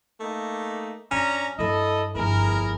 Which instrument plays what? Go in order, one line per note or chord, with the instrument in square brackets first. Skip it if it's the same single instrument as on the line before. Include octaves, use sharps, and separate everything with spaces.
[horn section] A3 A#3 D#4
[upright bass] F#2 [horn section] C#4 D4 A#5
[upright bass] G2 F#3 [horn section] E4 A4 D#5
[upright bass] G1 F2 [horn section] E4 G#4 A#4